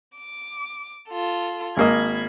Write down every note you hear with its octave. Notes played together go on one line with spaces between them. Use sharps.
D6
F4 A4
G#1 A#3 D#5 B5 G#6